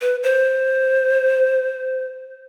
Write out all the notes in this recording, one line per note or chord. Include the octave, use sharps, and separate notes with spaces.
B4
C5